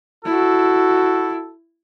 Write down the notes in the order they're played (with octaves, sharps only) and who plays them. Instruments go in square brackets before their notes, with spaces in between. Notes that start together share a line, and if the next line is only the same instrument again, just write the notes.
[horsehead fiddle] E4 [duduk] F#4 [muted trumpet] A4